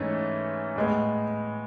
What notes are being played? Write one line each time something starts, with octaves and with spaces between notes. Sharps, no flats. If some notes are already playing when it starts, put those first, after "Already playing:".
Already playing: G#2 E3 A3 C#4
A2 G#3 B3